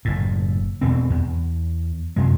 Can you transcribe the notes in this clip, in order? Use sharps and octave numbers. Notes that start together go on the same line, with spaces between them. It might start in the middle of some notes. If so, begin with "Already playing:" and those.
F#1 A2
E2 B2 C4
E2
F#2 C3 G#3